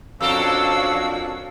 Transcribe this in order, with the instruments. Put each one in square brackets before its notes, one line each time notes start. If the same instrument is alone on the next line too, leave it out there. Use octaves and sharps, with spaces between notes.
[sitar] F2 A4 A#4 [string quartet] C#4 D4 F#4 [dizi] F5 [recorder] E6